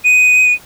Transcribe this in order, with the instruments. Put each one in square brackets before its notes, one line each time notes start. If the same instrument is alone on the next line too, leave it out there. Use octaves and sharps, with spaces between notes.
[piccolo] D#7